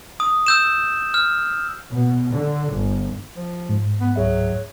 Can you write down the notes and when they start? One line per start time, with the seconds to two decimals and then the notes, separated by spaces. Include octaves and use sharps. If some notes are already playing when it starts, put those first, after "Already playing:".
0.20 D#6
0.46 E6 G6 E7
1.14 F6
1.92 B2
2.32 D3
2.71 G1
3.36 F3
3.69 G#2
4.00 B3
4.16 C#2 F#3 G#4 E5